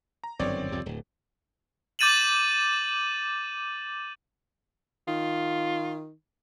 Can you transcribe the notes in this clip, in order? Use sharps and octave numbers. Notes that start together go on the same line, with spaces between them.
A#5
G1 F#2 D#3 C4 C#5 D5
C2 F2 C3
D1
D6 G6 A6 D#7 E7 F#7
D#3 F4